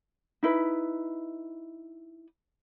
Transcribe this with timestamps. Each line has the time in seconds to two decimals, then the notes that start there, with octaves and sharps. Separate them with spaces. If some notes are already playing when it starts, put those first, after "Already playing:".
0.43 D#4 E4 B4